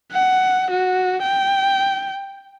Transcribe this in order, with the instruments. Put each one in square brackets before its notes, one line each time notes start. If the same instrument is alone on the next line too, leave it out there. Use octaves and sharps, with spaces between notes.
[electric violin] F#5
F#4
G5